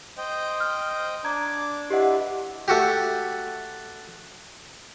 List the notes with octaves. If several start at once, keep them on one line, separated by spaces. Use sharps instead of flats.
C5 D#5 G5
F6
D4 A#5 D6 G#6
D4 E4 G4 B4 D#5 F#5
A3 F#4 G4